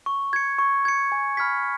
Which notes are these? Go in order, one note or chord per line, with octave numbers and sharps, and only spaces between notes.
C#6
G#6 C#7
C#6
G#6 C#7
G#5
B5 F6 G#6 B6